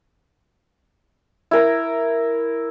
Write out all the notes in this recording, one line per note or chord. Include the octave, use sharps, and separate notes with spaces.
E4 A#4 A#5